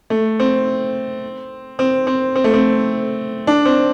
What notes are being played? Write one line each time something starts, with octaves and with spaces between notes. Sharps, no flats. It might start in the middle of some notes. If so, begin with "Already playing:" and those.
A3
C4
C4
C4
C4
A3
C4
D4
C4